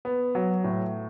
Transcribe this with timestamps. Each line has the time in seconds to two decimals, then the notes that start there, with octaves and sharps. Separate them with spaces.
0.05 B3
0.35 F#3
0.64 A2